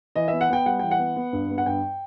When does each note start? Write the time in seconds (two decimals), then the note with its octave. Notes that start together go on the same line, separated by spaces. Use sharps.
0.16 E3 D#5
0.28 B3 E5
0.41 F#5
0.50 B3 G5
0.66 G3 F#5
0.79 E3 G5
0.91 F#5
0.99 B3
1.16 B3
1.33 G2
1.50 B3
1.58 F#5
1.66 G2 G5